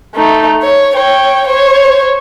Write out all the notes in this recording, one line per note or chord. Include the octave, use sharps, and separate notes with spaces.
A3 D#4
C#5
C#5 G5
C5 C#5